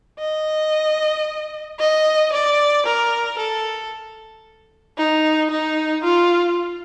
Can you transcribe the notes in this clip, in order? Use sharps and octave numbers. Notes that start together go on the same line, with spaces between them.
D#5
D#5
D5
A#4
A4
D#4
D#4
F4